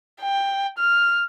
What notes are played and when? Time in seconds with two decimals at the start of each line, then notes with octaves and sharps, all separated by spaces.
0.22 G5
0.78 F6